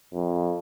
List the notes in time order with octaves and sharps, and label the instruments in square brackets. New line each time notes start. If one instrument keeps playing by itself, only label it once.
[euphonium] F2